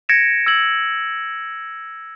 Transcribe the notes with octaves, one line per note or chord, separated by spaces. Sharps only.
G#6 A#6 C#7 D7 E7
E6 G#6 F#7